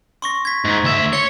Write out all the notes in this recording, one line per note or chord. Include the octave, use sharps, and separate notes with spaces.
C6 C#6 A#6
G#6 B6
G#2
D2 E5
C#5 C#7 G7